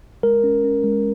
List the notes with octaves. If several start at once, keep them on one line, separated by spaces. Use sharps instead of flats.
G#3 A#4
C#4
C#4
G#3